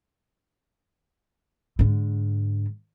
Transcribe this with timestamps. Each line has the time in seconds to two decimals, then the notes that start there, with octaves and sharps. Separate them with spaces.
1.79 G#2 D3